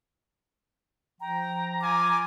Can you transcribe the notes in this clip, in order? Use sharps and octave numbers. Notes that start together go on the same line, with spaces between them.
F3 G5 A#5
F4 G#5 D6